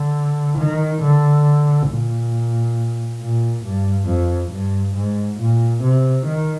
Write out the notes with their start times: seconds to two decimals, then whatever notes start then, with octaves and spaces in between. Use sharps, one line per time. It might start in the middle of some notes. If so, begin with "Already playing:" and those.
Already playing: D3
0.58 D#3
1.02 D3
1.89 A#2
3.21 A#2
3.64 G2
4.08 F2
4.52 G2
4.95 G#2
5.40 A#2
5.83 C3
6.26 D#3